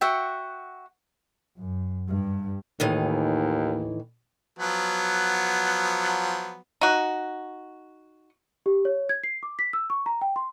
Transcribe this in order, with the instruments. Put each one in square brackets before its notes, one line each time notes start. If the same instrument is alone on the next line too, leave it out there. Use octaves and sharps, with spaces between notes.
[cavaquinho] F#4 E5 F#5 G5
[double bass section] F#2
G2
[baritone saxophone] D#2 [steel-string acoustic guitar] A2 D#3 E3
[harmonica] F3 F#3 B3
[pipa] D#4 F#4
[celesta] G4
C#5
G#6
C7
D6
B6
E6
C#6
A#5
G5
C6